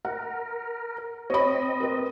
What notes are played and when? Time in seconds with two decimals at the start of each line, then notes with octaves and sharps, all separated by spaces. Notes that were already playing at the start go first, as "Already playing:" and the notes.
0.05 A#4 F#5
1.30 C4 C#5 D#5 B5
1.80 A#4 B4